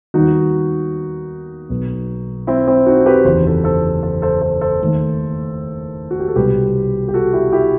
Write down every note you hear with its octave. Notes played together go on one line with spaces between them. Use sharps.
D#2 D#3 G3 B3 D#4 F#4
B1 B2 F#3 B3
C4 E4
C4 E4
D#4 F#4
G4 B4
F#1 E2 D#3 C5
A4 C5
A4 C5
A4 C5
A4 C5
A4 C5
A4 C5
D#2 D#3 A3
F#4
G4
A4
C2 B2 G3 B3 G4 B4
G4
F#4 A4
E4 G4
E4 G4